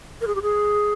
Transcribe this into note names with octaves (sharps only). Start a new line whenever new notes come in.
A#4
G#4
G4
G#4